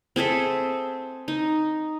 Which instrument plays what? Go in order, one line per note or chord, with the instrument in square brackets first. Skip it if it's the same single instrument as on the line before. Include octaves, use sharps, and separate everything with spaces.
[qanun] C4 G#4 A4 E5
D#4